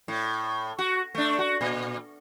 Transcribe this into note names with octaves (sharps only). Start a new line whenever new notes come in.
A2
F#4
A3 D4
F#4
A#2